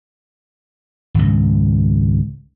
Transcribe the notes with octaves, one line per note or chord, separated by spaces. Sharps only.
G#1 C#2